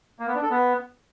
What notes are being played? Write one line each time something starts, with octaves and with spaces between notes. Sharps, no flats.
A#3
B3
D4
A4
B3